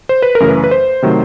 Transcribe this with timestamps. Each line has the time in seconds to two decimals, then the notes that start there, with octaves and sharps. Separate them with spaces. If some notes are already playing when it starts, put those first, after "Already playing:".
0.09 C5
0.22 B4
0.35 A#4
0.40 F#2 C#3 E3 A3
0.49 B4
0.64 B4
0.71 C5
1.02 C3 D#3 F#3 A3